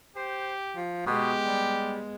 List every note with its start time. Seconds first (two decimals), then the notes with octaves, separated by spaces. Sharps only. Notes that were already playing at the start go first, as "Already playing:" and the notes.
0.16 G4 C5
0.76 F3
1.06 B2 G#3 B3 G4
1.45 G3